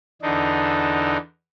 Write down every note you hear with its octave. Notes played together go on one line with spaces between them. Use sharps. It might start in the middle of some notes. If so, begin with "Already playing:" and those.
E2 D3 D4 D#4